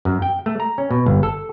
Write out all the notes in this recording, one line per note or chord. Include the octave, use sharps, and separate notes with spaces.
F#2
G5
A3
A#5
C#4
B2
G1
A4